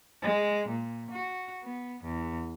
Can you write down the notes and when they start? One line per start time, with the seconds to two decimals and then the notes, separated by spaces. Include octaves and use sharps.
0.21 G#3
0.68 A#2
1.11 F#4
1.62 B3
2.02 E2